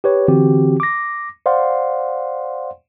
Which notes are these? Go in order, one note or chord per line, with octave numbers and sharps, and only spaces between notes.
G4 B4 C#5
D3 E3 C4 F#4 G4
D6 A#6
C5 D5 F5 F#5 C6